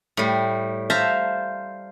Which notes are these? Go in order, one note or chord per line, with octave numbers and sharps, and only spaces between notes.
A2 G3
C5 E5 F5 A5 A#5